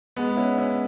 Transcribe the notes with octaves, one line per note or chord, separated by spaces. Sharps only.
G#3 B3
C#4 E4
C#4 E4